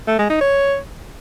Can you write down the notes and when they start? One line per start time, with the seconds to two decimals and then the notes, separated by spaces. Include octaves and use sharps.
0.08 A3
0.19 G#3
0.30 D#4
0.41 C#5